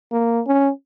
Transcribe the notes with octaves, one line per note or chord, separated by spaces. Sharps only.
A#3
C#4